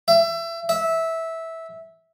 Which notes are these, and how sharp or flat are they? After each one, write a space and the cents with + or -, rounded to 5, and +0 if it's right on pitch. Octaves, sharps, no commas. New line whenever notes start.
E5 +25
E5 -15